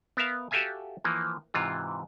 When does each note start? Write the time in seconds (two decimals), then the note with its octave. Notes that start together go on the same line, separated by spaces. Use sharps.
0.17 B3 A#4 E5 F5
0.51 F#4 G4 A4 E5 F5 G#5
1.04 E3 F3 A#3
1.54 G#2 C3 E3 F4